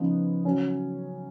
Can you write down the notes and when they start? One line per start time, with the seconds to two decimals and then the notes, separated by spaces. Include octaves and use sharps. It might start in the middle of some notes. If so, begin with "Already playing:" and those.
Already playing: C#3 F3 B3 D#4
0.44 C#3 F#3 C#4